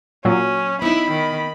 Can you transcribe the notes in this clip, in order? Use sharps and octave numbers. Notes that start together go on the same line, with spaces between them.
A#2 F#3 C#4
B3 D#4 E4 B5
D#3